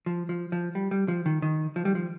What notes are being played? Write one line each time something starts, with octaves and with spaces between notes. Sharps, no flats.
F3
F3
F3
G3
G3
F3
D#3
D#3
F3
G3
F3